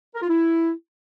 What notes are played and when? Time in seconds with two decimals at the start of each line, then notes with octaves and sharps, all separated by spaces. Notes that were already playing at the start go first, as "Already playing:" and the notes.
0.15 A#4
0.22 F4
0.29 E4